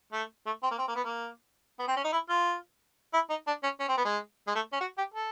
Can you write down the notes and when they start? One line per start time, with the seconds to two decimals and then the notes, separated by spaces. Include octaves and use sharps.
0.12 A3
0.46 A3
0.63 C4
0.71 A#3
0.79 C4
0.88 A#3
0.96 B3
1.04 A#3
1.79 B3
1.88 C4
1.96 C#4
2.04 D#4
2.13 E4
2.30 F4
3.14 E4
3.30 D#4
3.47 D4
3.63 C#4
3.80 C#4
3.88 C4
3.98 B3
4.05 G#3
4.47 G#3
4.55 A3
4.73 C#4
4.81 F#4
4.98 G4
5.14 A4